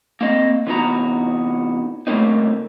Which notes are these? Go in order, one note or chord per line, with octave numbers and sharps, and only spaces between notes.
A#3 C4 D#5
C3 E3 B3 D#4 F#4 A#5
C#3 G3 A3 A#3 C4 D#4